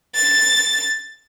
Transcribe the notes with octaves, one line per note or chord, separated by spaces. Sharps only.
A6